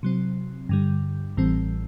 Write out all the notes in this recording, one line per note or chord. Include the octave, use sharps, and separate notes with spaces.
C3 F#3 C4
G2 D3 G3
A1 A2 E3 G3 C4